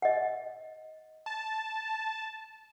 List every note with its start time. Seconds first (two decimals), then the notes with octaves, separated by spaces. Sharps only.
0.02 D#5 F#5
1.26 A5